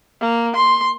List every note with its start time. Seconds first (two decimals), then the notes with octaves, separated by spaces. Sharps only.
0.21 A#3
0.56 C6